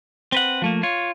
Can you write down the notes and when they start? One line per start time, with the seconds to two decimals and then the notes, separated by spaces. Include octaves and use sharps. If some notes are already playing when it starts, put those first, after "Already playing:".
0.32 C4 B4 F#5
0.62 F3 A3 A#3
0.83 F4 C#5